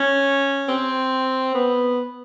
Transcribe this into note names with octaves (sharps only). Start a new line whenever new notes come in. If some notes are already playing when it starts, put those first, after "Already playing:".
Already playing: C#4
C4
B3